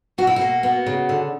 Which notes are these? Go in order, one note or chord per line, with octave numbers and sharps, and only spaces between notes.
B2 F#4
E4
A#3 F#4
B3
C#3
D3